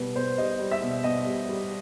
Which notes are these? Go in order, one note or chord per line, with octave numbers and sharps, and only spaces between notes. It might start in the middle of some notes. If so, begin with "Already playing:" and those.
Already playing: B2 G3 B4
B2 C5
G3 D#5
G3
E5
B2
B2 D#5
G3
G3